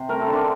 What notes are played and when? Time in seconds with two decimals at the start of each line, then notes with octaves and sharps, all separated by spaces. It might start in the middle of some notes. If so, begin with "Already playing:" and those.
Already playing: C3 C5
0.09 A3 A#4
0.21 A4
0.28 D3
0.33 D4